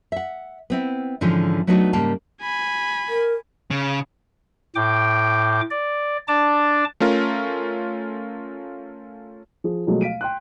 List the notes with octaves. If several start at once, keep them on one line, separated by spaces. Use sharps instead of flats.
E5 F#5
B3 C4 E4
G#2 D3 E3 F3 C#4
F#3 A3 B3 D4 D#4 F#4
G#2 C#3 G3 A#3 A#4 A5
G#5 B5
A#4
C#3
A2 G5 D6
D5
D4 D5 A5 D6
A3 C#4 F4 A#4
F3 G#4
B2 F3 F#3 G#3 A3
F5 B6 D7 D#7
G5 C6 F#6